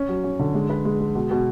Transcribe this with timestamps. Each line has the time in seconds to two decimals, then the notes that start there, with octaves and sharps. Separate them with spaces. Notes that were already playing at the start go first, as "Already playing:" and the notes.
Already playing: C#4
0.09 F#3
0.24 C#4
0.39 D3
0.54 G#3
0.70 B4
0.85 G#3
1.00 G#3
1.15 B2
1.31 B2